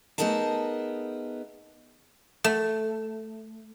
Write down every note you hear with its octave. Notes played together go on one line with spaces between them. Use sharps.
A3 B3 D#4 G#4 A#4 A5
A3